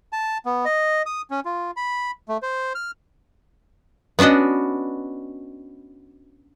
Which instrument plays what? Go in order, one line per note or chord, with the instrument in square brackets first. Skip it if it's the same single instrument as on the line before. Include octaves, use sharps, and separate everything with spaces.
[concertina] A5
B3
D#5
D#6
C#4
F4
B5
A3
C5
F6
[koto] B3 C#4 D4 F#4 D#5